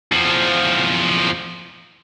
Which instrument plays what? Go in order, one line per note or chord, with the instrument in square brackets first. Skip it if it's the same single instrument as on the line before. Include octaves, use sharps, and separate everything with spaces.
[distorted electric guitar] E2 F3